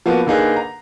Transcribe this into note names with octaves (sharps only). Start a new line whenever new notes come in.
F3 A#3 B3 F#4
D3 A#3 D#4 G#4 B4
A#5